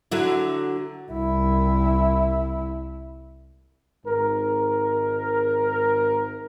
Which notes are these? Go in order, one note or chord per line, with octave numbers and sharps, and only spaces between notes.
D3 F#3 E4
C2 E4
G#1 G#2 A#4